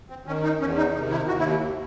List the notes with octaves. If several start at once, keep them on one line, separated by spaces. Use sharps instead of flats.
C4
D#3 C#4
D#4
E2 C#4
D#4
C3 D#3 D#4
E4
D#2 F#4
E4